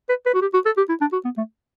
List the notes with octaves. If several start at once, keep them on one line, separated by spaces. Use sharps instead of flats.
B4
B4
F#4
G4
F#4
A4
G4
E4
D4
F#4
B3
A3